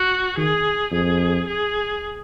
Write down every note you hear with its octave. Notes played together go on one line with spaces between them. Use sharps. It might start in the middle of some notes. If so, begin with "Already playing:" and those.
Already playing: F#4
D#3 G#4
F2 G#4
G#4